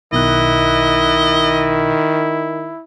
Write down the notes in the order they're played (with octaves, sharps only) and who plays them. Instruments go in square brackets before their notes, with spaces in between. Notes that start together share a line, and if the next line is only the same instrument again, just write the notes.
[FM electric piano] B1 B2 F#6 [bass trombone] D#3 [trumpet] E4 [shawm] D#5